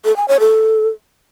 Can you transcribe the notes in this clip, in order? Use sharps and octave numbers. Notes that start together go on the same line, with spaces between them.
A4
G#5
C#5
A4